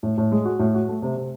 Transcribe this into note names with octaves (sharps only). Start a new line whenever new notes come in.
A2
A2
G#3
F#4
A2
F#4
A3
C3
C3